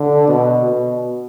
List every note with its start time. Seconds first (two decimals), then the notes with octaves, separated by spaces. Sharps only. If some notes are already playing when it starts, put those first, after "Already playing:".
Already playing: D3
0.28 B2
0.66 B2